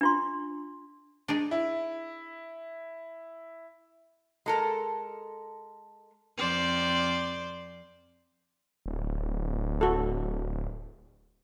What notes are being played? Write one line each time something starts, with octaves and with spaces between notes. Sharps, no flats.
D4 F4 C6
D4 D#4 G#4
E4
G#3 A4 A#4
F2 C5 D5
D1
F#4 A4